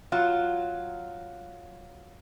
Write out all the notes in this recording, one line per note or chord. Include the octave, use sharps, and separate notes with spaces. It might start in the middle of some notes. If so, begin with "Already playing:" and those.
F#3 F4